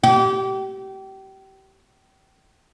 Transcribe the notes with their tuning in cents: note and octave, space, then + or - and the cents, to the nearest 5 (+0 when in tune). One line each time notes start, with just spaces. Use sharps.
G4 -30